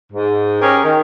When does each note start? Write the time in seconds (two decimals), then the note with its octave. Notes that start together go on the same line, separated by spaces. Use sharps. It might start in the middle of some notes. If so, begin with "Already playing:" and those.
0.13 G#2
0.61 C#4 G4 G#4 A#4
0.84 D#3